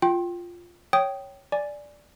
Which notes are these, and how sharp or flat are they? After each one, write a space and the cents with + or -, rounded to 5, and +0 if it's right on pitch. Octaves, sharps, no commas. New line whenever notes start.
F4 +0 G5 -10 C6 +35
C#5 +0 G5 -10 D#6 +0
D5 +0 G#5 +0